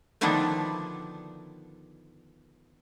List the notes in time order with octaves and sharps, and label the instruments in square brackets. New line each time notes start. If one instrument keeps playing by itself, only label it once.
[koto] D3 D#3 F3 B3 D4 E4